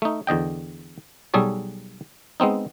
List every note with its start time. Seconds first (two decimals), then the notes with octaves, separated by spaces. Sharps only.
0.02 A3 D#4
0.27 E2 D3 D#5 G5
1.34 B1 G3 G#4 A4 C#5
2.40 G#3 B3 C4 D#4